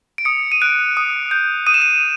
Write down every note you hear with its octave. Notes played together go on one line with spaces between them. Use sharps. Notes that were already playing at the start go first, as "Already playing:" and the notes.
D7
D#6 C#7
D#7
F#6 D7
D#6
G6
D#6 D#7
E7
D#7